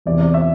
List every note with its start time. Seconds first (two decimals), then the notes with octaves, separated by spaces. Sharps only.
0.06 E2 C3 E3 D5
0.20 D5
0.34 E5